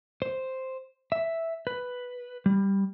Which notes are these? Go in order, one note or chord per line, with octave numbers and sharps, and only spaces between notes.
C5
E5
B4
G3